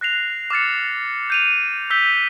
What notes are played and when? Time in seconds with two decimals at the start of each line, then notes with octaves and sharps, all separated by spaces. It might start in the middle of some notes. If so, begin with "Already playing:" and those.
0.01 F#6 A#6 C7 F7
0.50 D6 F6 A6 C#7
1.30 G6 D#7 F7
1.90 E6 G6 B6 G7